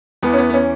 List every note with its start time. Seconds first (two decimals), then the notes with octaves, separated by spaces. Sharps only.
0.23 E2 E3 B3
0.33 C#4
0.38 B3
0.50 B3
0.53 C#4